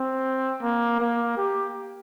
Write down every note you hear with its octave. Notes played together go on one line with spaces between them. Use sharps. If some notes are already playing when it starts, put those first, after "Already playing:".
Already playing: C4
A#3
A#3
G4